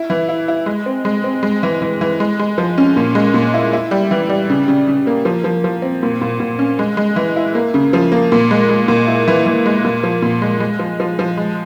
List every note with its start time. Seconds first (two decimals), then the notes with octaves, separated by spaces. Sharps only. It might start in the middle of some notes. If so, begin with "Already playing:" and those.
Already playing: E4
0.10 E3
0.29 E4
0.48 E4
0.66 G#3
0.86 C4
1.05 G#3
1.24 C4
1.43 G#3
1.63 E3
1.82 E3
2.01 E3
2.20 G#3
2.39 G#3
2.58 F3
2.78 C#4
2.96 A#2
3.15 G#3
3.34 A#2
3.54 E4
3.73 E4
3.91 G3
4.11 E3
4.29 G3
4.50 C#3
4.68 C#3
4.88 C#3
5.07 A#3
5.25 F3
5.44 F3
5.64 F3
5.82 C4
6.03 A#2
6.21 A#2
6.40 A#2
6.59 C#4
6.79 G#3
6.97 G#3
7.16 E3
7.36 E4
7.55 A#3
7.74 C#3
7.93 F3
8.12 A#3
8.32 A#2
8.51 G#3
8.69 G#3
8.88 A#2
9.08 E4
9.28 E3
9.46 E3
9.66 G#3
9.85 A#2
10.03 F3
10.22 A#2
10.42 G#3
10.60 G#3
10.79 F3
11.00 F3
11.19 F3
11.37 G#3